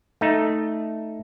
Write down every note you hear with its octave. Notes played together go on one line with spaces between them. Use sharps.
A3 D#4